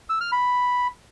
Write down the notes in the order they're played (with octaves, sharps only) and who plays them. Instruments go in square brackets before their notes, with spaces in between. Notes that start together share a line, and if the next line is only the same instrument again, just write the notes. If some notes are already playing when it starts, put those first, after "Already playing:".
[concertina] E6
F6
B5